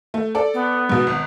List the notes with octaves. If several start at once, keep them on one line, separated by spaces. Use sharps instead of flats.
A3
A4 D5
B3
G#2 B2
G#1